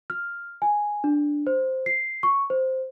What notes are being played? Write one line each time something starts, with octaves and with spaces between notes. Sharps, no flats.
F6
G#5
D4
C5
C7
C#6
C5